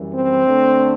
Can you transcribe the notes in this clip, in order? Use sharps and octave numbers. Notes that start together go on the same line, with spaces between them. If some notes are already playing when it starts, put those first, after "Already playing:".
Already playing: F#2 E3 G3
C4
D2 D3 A3